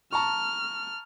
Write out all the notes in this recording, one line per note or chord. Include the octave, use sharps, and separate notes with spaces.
A5 A#5 C#6 F6